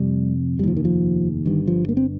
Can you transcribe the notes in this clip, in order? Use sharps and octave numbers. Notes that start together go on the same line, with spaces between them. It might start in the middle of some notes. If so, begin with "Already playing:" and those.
Already playing: F1 F2 C3 G3
F1 D#2 F3 G3
D#3
F3
G1 G2 D#3
F3
A#3
C4